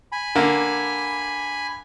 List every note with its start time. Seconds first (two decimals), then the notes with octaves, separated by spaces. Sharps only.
0.12 G#5 B5
0.35 D3 A#3